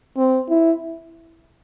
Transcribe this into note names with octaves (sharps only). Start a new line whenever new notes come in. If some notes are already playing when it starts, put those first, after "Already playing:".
C4
E4